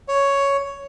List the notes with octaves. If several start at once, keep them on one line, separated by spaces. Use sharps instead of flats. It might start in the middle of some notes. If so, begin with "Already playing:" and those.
C#5